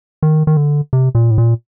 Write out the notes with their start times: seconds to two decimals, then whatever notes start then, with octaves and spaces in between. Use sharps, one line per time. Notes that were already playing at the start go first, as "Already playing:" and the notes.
0.23 D#3
0.47 D#3
0.57 D3
0.93 C3
1.15 A#2
1.31 A2
1.38 A#2